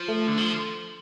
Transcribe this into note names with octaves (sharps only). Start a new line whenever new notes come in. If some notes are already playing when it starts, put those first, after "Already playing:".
Already playing: F3
A3
D3
F3